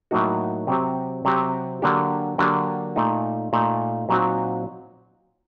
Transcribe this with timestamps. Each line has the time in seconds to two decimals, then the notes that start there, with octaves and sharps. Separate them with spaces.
0.11 A2 F#3 A#3 D#4 F#4
0.67 C3 F#3 C4 G4
1.25 C3 F#3 C4 G4
1.82 D3 F#3 A#3 D4 G4
2.38 D3 F#3 A#3 D4 G4
2.96 A#2 A3 D#4
3.53 A#2 A3 D#4
4.09 A#2 F#3 C4 D#4 F#4